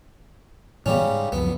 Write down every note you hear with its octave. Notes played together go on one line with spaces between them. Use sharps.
A2 C#3 E3 G3 B3 C#4
G#2
C#2 F#2 F3 B3